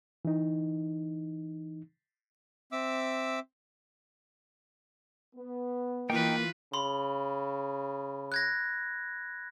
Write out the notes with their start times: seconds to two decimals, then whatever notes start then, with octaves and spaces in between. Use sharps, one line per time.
0.25 E3 D#4
2.72 C4 E5 D6 E6
5.35 B3
6.10 E3 A#3 D#4 F4 B4 G5
6.74 C#3 B5 C6
8.32 F#6 G#6 A#6